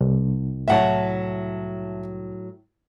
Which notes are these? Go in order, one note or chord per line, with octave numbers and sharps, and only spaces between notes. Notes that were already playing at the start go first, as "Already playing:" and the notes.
C2
A2 F#3 C#5 E5 F#5 A5